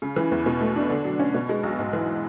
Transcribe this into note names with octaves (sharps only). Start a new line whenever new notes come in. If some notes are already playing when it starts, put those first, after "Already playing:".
C#3
E3
E2
B2
A3
D4
D3
F#3
C#4
B2
G#3
B1
G#2
E3